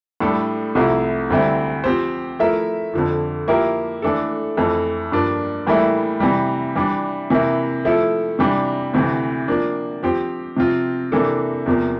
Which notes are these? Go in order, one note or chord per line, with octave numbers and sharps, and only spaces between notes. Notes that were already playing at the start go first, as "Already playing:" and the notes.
A2 G3 D4 A4
C2 C3 F3 A3 E4
D2 D3 G3 C4 E4
F3 C4 G4 C5
F3 A3 E4 A#4 E5
F2 D3 F3
F3 A#3 E4 G4 A#4
E3 A3 D4 A4
F2 E3 A3
G2 F3 A#3 D4
A2 E3 G3 A#3 E4
C3 E3 G3
E3 G3 D4
C3 E3 A#3 E4
F3 A3 E4 A4
C3 E3 G3 D4
D2 C3 E3
F3 A#3 D4
F3 C4 G4 C5
C3 F3 C4 F4
C3 E3 A#3 D4 A4
E2 C3 F3 A#3